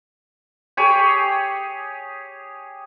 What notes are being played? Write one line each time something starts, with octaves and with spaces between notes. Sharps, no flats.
G4 G#4 C#5